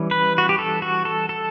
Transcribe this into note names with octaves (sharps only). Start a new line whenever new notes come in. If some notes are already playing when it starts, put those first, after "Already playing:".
Already playing: E3 G3 C#4
B4
F#4
G4
A4
F#4
A4
A4